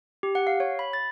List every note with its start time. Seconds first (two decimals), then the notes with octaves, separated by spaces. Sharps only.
0.23 G4
0.35 F#5
0.47 F5
0.60 C#5
0.79 B5
0.93 A6